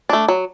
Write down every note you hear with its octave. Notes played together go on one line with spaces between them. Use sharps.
A3 D4
F#3